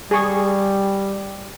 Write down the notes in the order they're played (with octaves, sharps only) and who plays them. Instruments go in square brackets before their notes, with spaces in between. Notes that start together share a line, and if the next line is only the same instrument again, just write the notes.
[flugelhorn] G3 [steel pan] G#4 C#6